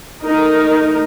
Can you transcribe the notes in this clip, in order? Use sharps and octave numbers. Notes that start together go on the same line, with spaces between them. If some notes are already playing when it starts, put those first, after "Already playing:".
A3 D#4 A#4